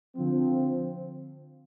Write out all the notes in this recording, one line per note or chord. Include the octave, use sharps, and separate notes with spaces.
D3 F3 C4